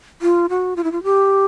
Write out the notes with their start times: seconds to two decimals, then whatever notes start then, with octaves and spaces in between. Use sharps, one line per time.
0.22 F4
0.49 F#4
0.76 F4
0.84 E4
0.92 F4
1.04 G4